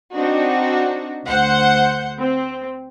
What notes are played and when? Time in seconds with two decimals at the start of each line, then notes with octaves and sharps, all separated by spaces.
0.14 C4 D4 D#4 F#4
1.26 D2 C5 F#5 G6
2.19 C4